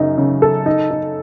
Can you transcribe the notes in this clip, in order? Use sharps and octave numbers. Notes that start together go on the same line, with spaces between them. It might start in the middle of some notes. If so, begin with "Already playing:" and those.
Already playing: F#2 C#3 D#4
C#3
A4
D#4
D#4